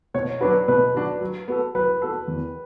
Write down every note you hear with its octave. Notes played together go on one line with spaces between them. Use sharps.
B2 C#5
F#3 B3 D4 F#4 B4
B2 B4
F#3 B3 D4 F#4
F#3
B3 F#4 A4
F#3 B4
B3 F#4 A4
E2